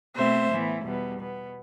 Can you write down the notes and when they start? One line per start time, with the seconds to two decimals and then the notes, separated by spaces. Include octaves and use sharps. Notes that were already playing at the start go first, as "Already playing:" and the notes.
0.16 B2 A3 C4 C5 E5
0.51 A2 E3 B3
0.84 E2 B2 G3 B3
1.19 B2 B3